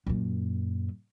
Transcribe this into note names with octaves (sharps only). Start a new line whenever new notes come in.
F#2 A#2